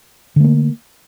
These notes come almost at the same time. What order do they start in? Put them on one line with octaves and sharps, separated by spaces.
D3 A3 A#3